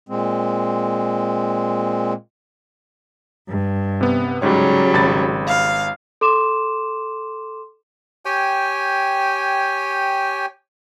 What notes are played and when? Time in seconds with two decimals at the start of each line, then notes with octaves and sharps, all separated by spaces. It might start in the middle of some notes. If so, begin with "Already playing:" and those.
0.09 A#2 G#3 C4
3.50 G2
4.01 C3 B3
4.42 G#2 C#3 F#3 G3 C#5
4.94 G#1 B5 A6
5.46 F5
6.21 A4 C6 D6 E7
8.25 G4 C#5 G5 G#5